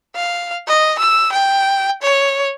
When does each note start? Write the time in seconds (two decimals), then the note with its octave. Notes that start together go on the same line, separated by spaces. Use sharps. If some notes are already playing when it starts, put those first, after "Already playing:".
0.16 F5
0.68 D#5
0.99 E6
1.33 G5
2.02 C#5